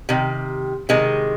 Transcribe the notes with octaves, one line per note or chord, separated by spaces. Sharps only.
C3 D#3
C3 D#3 G#3